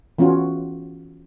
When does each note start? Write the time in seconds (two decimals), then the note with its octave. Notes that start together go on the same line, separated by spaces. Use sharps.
0.18 E3 B3 C#4 F4 F#4